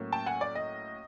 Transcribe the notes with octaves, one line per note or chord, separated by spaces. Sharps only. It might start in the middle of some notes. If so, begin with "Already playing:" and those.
Already playing: A2 F#3 A#3 C#4
G5 A5
F#5 G#5
D5
D#5